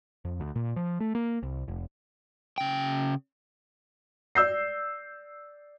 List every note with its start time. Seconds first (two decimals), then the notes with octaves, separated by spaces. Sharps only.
0.25 F2
0.40 D2
0.56 A#2
0.76 F3
1.00 A3
1.15 A#3
1.43 C2
1.68 F1
2.58 C#3 G5
4.35 D5 E6 G6 C7